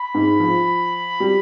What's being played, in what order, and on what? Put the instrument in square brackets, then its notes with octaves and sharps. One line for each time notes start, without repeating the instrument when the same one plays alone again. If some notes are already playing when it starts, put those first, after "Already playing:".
Already playing: [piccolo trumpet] B5
[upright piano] G#2
F3
G3